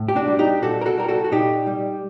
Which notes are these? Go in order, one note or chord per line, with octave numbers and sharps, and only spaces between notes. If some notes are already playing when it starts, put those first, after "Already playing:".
Already playing: A2
G4
D4 F#4
G3
D#4 G4
A#2 F#4 A4
A#4
F#4 A4
G3 A#4
F#4 A4
F#4
A#2 D#4 G4
G3